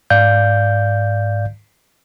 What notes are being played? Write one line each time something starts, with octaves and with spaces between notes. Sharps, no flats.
G#2 D5 F5 G6